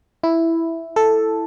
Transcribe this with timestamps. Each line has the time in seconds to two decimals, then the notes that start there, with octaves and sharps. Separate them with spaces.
0.23 E4
0.96 A4